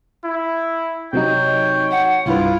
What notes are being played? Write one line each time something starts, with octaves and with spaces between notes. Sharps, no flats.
E4
C3 F#3 D#4 C#5 G5
F#5
C2 G2 E4 F4 B4